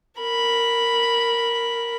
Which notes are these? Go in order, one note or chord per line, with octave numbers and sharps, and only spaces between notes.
A#4 B5